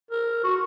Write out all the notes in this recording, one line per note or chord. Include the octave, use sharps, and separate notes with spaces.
A#4
F#4